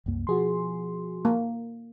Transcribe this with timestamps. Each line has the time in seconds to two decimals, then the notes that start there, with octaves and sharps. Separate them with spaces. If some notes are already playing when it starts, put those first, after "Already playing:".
0.06 C2 F#2 A#3
0.27 B2 F3 F#4 G#4 C6
1.25 A#3